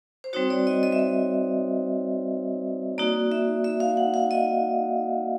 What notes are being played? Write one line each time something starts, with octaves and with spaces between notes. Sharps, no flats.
C5
G3 C4 D#4 F#4 C#5
D5
D#5
D#5
E5
D#5
A#3 D#4 F#4 D5
E5
E5
F5
F#5
F5
D#5